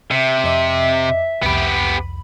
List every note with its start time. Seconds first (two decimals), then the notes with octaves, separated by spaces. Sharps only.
0.11 C3 E5
0.44 F2 D#5 D6
1.42 C2 F2 B3 G4 B5